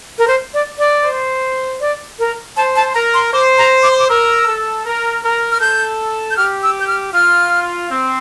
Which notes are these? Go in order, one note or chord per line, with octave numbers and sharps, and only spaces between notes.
A#4
C5
D5
D5
C5
D5
A#4
C5 A5
A5
A#4 A#5
C6
C5 D6
A#5
D6
C6
D6
A#4 E6
A4
A#4
A#4
F6
A4 G6
G6
G4 F6
E6
G6
F6
F4 F6
C4